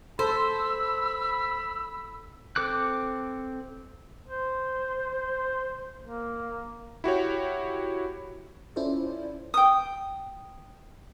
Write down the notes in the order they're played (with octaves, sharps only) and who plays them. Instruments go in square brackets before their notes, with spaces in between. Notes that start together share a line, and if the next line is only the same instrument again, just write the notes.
[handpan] A4 [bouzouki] C5 [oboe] B5 [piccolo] E6
[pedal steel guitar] C4 A4 D6 F#6
[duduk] C5
A#3
[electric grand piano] E4 F#4 G4 C#5
[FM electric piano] C#4 E4 F4 A4 C5 D5
[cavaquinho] G5 D#6